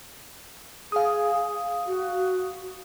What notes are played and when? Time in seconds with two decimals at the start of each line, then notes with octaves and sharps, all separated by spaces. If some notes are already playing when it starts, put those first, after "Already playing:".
0.92 G#4 F5 D#6
1.87 F#4